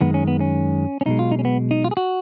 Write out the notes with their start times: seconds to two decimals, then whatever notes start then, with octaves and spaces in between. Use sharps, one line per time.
0.01 F#2 D#3 G#3 B3
0.14 C#4
0.28 B3
0.40 C#4
1.01 C#4
1.06 B1 B2 G#3 D#4
1.19 F4
1.32 D#4
1.39 C#4
1.45 B3
1.71 D#4
1.84 F4
1.91 G#4
1.97 F#4